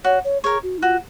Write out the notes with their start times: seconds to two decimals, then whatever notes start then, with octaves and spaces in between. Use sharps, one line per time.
0.04 F#4 C#5
0.24 C#5
0.44 G#4 A#4 C#5
0.63 F#4
0.78 D#4
0.82 F4 F#4